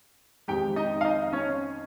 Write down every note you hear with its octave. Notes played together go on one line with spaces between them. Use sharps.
F2 D#3 G#3 G4 G5
D#4 D#5
F5
D#4 D#5
C#4 C#5